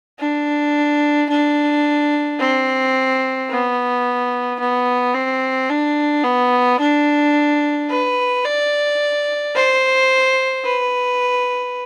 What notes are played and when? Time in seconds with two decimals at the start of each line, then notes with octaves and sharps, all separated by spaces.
0.19 D4
1.29 D4
2.39 C4
3.49 B3
4.60 B3
5.15 C4
5.70 D4
6.24 B3
6.80 D4
7.90 B4
8.45 D5
9.55 C5
10.65 B4